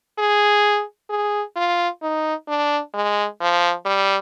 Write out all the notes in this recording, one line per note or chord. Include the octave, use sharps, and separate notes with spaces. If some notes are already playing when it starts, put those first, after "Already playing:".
G#4
G#4
F4
D#4
D4
G#3
F3
G3